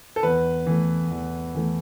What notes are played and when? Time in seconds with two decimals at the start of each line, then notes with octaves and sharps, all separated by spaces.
0.16 A4
0.23 E2 B4
0.67 E3 A3
1.11 E2
1.55 E3 A3